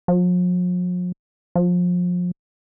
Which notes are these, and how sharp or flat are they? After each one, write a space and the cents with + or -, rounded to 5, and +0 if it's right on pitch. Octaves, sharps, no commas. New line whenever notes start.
F3 +45
F3 +30